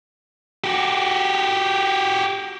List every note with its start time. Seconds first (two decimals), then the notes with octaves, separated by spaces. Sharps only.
0.64 F#4 G4